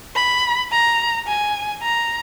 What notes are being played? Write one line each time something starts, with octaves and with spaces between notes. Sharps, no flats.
B5
A#5
G#5
A#5